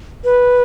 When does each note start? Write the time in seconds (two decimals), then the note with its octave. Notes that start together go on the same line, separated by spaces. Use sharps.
0.24 B4